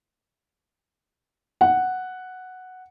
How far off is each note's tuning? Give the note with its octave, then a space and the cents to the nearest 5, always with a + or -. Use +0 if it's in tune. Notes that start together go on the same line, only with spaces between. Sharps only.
F#5 +0